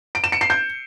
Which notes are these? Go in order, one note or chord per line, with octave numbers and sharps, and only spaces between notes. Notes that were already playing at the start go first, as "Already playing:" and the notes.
D7
E7
C#7
C7
G6